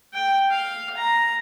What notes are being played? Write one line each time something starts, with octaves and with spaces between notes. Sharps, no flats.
G5
F5
A#5